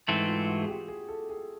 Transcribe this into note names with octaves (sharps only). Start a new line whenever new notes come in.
G#2 E3 A3 C4 E4
F4
F#4
G#4
G4
G#4
A4
G#4